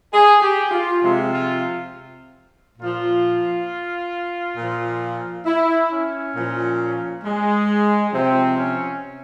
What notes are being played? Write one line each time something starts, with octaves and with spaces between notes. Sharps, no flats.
G#4
G4
F4
C3 F3 G#3
F4
A#2 F3 F4
A#2 F3
E4
C#4
A#2 F3
G#3
C3 F3 C4
C#4